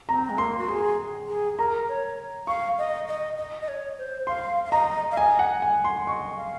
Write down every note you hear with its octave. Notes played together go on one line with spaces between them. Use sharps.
C4 A#5
G#3
A#3 C6
F#4
G#4 C6
G#4
A#4 A#5
C#5
F5 C#6
D#5
D#5
D#5
D#5
C#5
C5
F5 C6
F5
D#5 A#5
F5
D#5 G#5
F#5
G#5
C6
D#5 C#6
F5